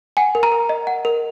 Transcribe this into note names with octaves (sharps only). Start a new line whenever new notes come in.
F#5 G#5
A#4
A#5
A#4
D#5
F#5
A#4